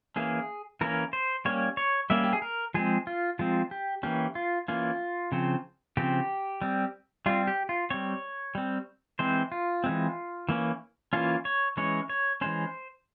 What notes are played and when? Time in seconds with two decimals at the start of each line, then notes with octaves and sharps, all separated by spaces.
0.16 E3 A#3 C#4 G#4
0.81 E3 A#3 C#4 A#4
1.13 C5
1.45 G3 A#3 C#4 C#5
1.77 C#5
2.10 G3 A#3 C#4 E5
2.24 G4
2.33 G#4
2.42 A#4
2.74 F3 G#3 C4 G#4
3.07 F4
3.39 F3 G#3 C4 F4
3.71 G4
4.03 E3 A#3 C#4 G4
4.35 F4
4.68 E3 A#3 C#4 F4
5.32 C#3 F3 C4
5.97 C#3 F3 C4 G4
6.62 G3 C4
7.26 G3 C4 F4
7.47 G4
7.69 F4
7.90 G3 C4 C#5
8.55 G3 C4
9.19 E3 G#3 C4 C5
9.52 F4
9.84 E3 G#3 C4
10.49 E3 A#3 C#4
11.13 E3 A#3 C#4 F4
11.45 C#5
11.77 E3 G#3 C#4 C#5
12.09 C#5
12.41 E3 G#3 C#4 C5